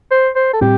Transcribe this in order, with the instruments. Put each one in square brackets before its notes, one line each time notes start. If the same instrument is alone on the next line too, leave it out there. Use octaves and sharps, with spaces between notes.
[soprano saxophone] C5
C5
A4
[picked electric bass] A2 G3 C4 [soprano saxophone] G4